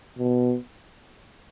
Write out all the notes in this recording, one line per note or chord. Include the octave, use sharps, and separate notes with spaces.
B2